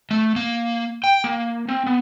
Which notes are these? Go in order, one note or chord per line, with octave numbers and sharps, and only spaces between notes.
A3
A#3
G5
A#3
C4
B3